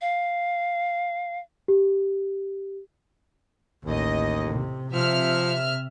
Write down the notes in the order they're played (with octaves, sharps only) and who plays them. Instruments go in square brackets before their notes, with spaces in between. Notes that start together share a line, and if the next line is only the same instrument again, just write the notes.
[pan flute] F5
[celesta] G4
[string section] A1 D#5 [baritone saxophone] D#2
[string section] C3
[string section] C3 E5 F6 [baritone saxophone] F3